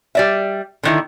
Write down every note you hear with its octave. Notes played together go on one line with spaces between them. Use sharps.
G3 D5 E5
D3 D#3 E4